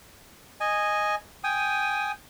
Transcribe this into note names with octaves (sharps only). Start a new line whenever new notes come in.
D#5 G#5
G5 G#5 D#6